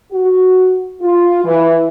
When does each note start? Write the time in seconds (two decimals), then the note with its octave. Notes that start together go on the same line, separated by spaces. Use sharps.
0.12 F#4
1.01 F4
1.45 E3